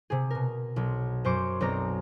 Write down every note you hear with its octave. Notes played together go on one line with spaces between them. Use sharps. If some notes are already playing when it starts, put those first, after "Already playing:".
C3 G#4
B2 A#4
B1
F#2 C5 C#6 D6 D7
B1 B2 C4 D5 A#5